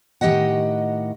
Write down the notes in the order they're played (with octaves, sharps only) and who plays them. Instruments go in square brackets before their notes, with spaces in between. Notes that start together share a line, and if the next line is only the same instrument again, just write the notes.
[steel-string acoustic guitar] A2 D#3 A3 G4 D#5 F#5